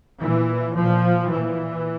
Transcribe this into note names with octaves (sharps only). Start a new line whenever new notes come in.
A#2 E3
A#2 F3
A#2 E3